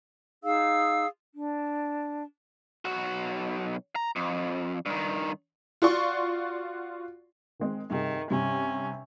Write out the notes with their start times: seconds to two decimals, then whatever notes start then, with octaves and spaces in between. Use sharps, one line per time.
0.43 D#4 G#4 F5 E6
1.35 D4
2.85 B1 F#4
3.96 A#5
4.16 F2
4.86 G2 D#3
5.82 F4 F#4 D5 C6 C#6
7.60 D#3 G#3 C4
7.90 G2 C3 D#3 G#4
8.30 G2 C3 C#4